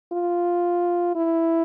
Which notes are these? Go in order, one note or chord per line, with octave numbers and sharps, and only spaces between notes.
F4
E4